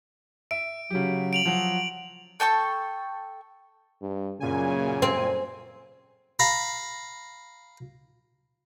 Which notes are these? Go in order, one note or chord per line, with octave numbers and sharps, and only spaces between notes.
E5 D7
C#3 F#3 G4
D7 F7 F#7
F3 F#3 F#5
A4 G5 A5 C#6
G2
F#2 A#2 C#3 G#5
C4
F5 A#5 B5